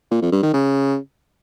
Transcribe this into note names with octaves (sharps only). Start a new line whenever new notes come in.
A#2
F2
G2
D#3
C#3